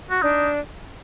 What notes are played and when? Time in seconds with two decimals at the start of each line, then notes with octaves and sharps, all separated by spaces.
0.11 F#4
0.22 D4 D#4